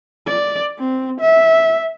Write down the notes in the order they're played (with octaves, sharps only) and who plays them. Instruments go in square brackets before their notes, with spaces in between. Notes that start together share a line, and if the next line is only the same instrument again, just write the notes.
[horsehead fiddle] D5
C4
E5